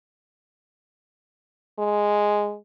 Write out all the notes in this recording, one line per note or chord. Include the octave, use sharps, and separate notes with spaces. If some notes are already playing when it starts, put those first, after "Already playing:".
G#3